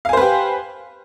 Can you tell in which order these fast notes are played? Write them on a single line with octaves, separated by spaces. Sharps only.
F5 G#5 C5 B4 G4